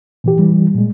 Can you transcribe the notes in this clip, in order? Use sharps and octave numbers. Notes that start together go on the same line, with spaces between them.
A#2 E3 G4
E3 G3
A#2 G#3